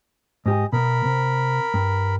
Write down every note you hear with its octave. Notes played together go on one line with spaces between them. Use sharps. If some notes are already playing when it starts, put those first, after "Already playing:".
G#2 G4 D#5 G#5
B2 B3 A#4 B5
C3
G2